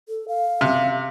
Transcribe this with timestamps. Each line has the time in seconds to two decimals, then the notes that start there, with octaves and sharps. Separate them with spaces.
0.08 A4
0.28 F5
0.61 C3